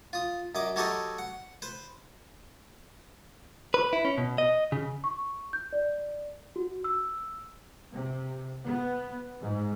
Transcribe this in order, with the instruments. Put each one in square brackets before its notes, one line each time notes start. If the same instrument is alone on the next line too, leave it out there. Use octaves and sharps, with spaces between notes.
[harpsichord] F4 D#6
F#2 D#5 D6
F#3 F#4 G4 A4 B4 D#5
F#5
B4 C5
[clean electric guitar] B4
E4
C#4
B2
D#5
C#3
[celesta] C#6
G6
D5
F#4
E6
[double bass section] C3
B3
G#2